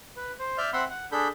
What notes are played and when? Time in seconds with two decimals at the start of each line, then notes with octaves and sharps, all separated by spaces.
0.16 B4
0.39 C5
0.58 D5 E5 F6 G6
0.73 C4 E5 F#5 B5 C6
0.90 F#5
1.12 D4 G#4 A4 B5 G6